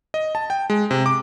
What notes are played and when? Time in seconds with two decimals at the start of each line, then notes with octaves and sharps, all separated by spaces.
0.14 D#5
0.35 A5
0.50 G5
0.70 G#3
0.91 C3
1.06 D6